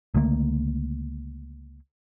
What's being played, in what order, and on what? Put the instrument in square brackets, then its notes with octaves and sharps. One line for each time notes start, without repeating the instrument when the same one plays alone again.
[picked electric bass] C#2 D3 A3 A#3